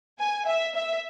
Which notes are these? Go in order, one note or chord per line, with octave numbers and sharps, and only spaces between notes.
G#5
E5
E5